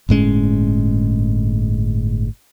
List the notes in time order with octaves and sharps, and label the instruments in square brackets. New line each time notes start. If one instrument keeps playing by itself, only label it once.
[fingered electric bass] G1 A2 G#3 C#4